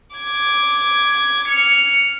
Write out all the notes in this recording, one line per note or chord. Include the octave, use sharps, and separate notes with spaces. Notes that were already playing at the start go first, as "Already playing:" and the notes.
D6 G#6
F6 C#7